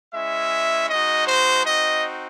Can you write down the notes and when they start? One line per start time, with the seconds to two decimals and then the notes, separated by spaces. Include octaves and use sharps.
0.14 G#3 C#4 E4 E5
0.90 G#3 D#4 F#4 D#5
1.27 C5
1.65 C4 D#4 F#4 D#5